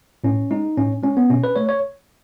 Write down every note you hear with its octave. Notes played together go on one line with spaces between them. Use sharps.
A2 C#4
G#3 D#4
A2 C#4
G#3 C#4
B3
B2 C#4
B4
A3 C#5
C#5